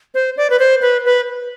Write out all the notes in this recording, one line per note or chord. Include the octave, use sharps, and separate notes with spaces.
C5
D5
B4
C5
B4
B4